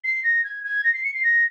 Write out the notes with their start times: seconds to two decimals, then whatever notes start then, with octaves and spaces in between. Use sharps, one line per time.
0.04 C7
0.23 A#6
0.44 G#6
0.64 G#6
0.84 A#6
0.93 C7
1.04 C#7
1.14 C7
1.23 A#6